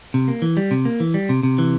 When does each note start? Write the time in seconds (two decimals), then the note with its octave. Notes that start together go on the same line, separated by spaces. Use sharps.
0.14 C3
0.28 A#3
0.42 E3
0.57 G3
0.71 C3
0.85 A#3
1.00 E3
1.14 G3
1.29 C3
1.43 C3
1.58 E3